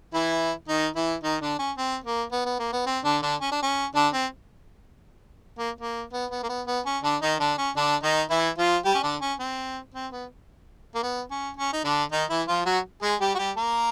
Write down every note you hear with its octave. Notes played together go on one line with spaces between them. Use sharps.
E3 E4
D#3 D#4
E3 E4
D#3 D#4
D3 D4
C#4
C4
A#3
B3
B3
A#3
B3
C4
D3 D4
D3 D4
C#4
D4
C#4
D3 D4
C4
A#3
A#3
B3
B3
A#3
B3
B3
C#4
D3 D4
D#3 D#4
D3 D4
C#4
D3 D4
D#3 D#4
E3 E4
F3 F4
G3 G4
C#4
D3 D4
C#4
C4
C4
B3
A#3
B3
C#4
C#4
D#4
D3 D4
D#3 D#4
E3 E4
F3 F4
F#3 F#4
G#3 G#4
G3 G4
F#4
G3 G4
A#3 A#4